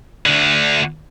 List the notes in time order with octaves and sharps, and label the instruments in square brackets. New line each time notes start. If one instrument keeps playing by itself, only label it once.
[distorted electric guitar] D2 D3